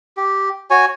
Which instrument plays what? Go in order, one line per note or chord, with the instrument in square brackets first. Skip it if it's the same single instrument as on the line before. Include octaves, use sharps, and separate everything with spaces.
[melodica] G4
F#4 C#5 G#5